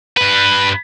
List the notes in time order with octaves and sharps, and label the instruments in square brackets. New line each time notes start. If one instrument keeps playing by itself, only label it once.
[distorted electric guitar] G2 B4